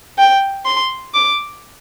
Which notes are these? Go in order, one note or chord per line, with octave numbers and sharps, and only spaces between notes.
G5
C6
D6